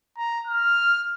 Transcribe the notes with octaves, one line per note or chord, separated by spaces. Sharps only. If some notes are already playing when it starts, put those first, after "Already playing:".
A#5
F6